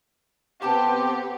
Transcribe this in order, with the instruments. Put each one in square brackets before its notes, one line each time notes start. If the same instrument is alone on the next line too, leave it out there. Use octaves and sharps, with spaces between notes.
[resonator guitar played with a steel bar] C3 A4 A5 [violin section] B3 C4 G4